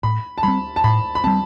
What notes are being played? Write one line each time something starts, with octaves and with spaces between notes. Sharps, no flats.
A2 B5
A5
G3 C4 B5
A5
A2 B5
B5
G3 C4 A5